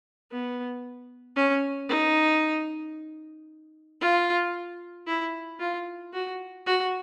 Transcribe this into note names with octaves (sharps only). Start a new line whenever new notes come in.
B3
C#4
D#4
F4
E4
F4
F#4
F#4